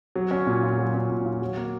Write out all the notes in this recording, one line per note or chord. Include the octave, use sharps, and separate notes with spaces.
F#3
C#4
A#2
F4
F#3
C#4
A#2
F4
F#3
A#3